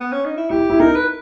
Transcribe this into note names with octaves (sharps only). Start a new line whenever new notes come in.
B3
C#4
D#4
E4
E4 G4
E4
D#4 A#4
B4